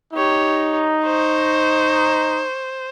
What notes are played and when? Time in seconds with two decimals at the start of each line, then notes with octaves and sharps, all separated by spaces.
0.14 D#4 G4 C#5
1.05 C5 C#6